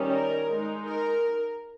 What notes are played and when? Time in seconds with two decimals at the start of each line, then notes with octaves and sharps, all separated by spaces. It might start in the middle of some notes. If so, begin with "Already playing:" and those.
Already playing: D#3 G3 C#4
0.10 A#4
0.48 G#3 D#4
0.85 A#4